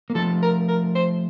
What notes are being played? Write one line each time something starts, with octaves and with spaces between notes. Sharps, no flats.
A#3
F3 A3 A4
A#4
A#4
C5